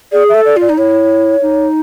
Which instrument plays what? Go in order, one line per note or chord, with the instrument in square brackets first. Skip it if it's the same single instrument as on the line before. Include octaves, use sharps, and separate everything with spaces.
[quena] G#4 [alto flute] D5
[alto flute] E5
[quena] A4
[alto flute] D5
[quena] F4 [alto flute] D5
[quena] D#4
[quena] E4 [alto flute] C#5
[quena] D#4